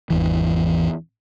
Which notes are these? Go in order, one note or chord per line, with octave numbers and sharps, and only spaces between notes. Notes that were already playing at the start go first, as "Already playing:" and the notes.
G#1 E2 E3